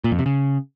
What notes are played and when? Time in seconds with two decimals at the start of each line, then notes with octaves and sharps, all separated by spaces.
0.04 A#2
0.11 F2
0.19 C3
0.26 C#3